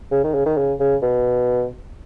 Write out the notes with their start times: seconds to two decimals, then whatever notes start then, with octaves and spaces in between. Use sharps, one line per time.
0.12 C#3
0.24 D#3
0.34 C#3
0.46 D#3
0.57 C#3
0.80 C#3
1.02 B2